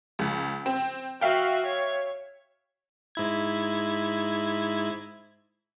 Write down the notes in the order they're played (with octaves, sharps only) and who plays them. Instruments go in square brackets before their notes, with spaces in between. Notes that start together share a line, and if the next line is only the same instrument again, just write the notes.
[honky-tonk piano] C#2
C4
[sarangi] F#4 [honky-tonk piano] E5 F5 G5
[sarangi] C#5
[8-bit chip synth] G#2 E4 G#6